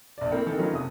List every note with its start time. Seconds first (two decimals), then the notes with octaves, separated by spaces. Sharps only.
0.18 A#1 D5
0.31 A3 A#3 C4 E4 A#4
0.46 D#3 E3 C4 A4 A#4
0.58 D#3 F#3 A3 B3 C#4 F4
0.72 F#1 C3 D#6